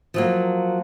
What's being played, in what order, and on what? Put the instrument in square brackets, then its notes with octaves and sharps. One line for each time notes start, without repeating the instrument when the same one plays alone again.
[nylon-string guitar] F3 F#3 A#3